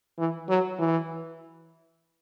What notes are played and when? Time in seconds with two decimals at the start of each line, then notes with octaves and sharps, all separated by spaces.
0.18 E3
0.49 F#3
0.79 E3